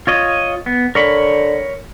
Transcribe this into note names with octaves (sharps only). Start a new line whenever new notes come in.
F4 C#5 D#5
B3
D3 A#4 C#5 B5